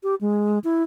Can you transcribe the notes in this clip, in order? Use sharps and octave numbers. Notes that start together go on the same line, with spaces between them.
G4
G#3
E4